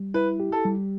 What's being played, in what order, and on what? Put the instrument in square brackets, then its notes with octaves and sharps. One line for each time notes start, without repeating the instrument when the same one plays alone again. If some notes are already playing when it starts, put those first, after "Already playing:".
Already playing: [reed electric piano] G3
[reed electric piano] E4 [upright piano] B4
[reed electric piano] G4
[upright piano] A4
[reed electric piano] G3